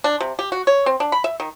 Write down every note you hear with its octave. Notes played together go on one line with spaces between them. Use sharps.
D4
C3
G4
F#4
C#5
C4
D4
B5
E5
D#3